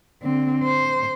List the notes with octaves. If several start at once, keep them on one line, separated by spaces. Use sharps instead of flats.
D3 C4
C5